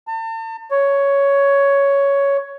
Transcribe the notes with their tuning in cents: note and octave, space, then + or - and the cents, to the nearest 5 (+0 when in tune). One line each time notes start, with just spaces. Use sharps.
A5 +40
C#5 +10